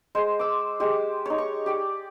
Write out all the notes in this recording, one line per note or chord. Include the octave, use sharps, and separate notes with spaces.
G#3 C5
D6 E6
G#3 G4
D#4 C#5
C#6
G4 D5 G5